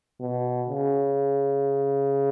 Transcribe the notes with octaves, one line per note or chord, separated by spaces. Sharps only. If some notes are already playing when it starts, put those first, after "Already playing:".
B2
C#3